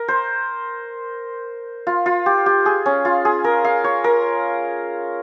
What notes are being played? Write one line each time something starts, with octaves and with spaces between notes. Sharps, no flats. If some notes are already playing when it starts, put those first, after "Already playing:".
Already playing: A#4
C5
F4
F4
G4
G4
G#4
C#4
F4
G#4
A#4
F5
C#5
A#4